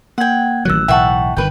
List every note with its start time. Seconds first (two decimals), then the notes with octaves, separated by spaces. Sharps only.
0.18 A#3 F#5 G5 G#6
0.65 A1 D#3 F#3 E6 F#6
0.88 B1 A2 E3 E5 F#5 G5 A5 C#6
1.37 G1 C3 D#3 B4 G5